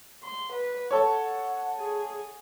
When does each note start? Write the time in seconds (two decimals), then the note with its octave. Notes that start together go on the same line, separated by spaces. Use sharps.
0.24 C6
0.53 B4
0.91 A4 C#5 F#5
1.76 G#4